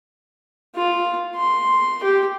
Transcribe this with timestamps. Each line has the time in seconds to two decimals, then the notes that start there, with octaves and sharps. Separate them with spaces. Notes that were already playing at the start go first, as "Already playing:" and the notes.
0.76 F4
1.36 C6
2.03 G4